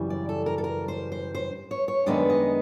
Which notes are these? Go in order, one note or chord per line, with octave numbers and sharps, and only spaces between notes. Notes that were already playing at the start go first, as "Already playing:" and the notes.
Already playing: F#2 C#3 E3 G3
D5
A4
A#4
A4
A#4
C5
C5
C5
C#5
C#5
F#2 D#3 G#3 B3 D4 D5
D#5